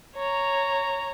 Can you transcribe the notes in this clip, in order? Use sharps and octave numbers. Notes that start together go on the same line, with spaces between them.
C#5 A#5